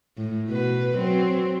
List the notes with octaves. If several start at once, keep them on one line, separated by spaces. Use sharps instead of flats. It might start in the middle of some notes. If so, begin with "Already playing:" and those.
A2
B2 B4
F#3 C4